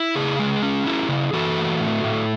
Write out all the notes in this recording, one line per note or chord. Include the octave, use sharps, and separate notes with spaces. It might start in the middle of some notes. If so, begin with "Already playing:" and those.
Already playing: E4
C#3 G#4
G#3
C#4
E4
C#3
E3 F#4 A4
A3
A2
A2